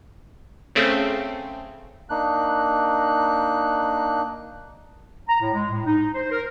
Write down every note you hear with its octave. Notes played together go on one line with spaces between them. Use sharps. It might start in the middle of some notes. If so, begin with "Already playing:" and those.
C#3 A3 C4
A#3 D4 D#4 F#6
A#5
A2
G#3
A2
D#4
C5
A#4